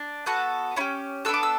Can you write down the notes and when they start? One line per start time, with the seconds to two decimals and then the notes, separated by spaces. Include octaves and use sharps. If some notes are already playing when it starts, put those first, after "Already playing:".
Already playing: D4
0.26 B3 F#4 A4 F#6
0.76 C#4 E4
0.80 G4
1.25 B3 D4 F#4 A4 E6
1.34 D6
1.43 E6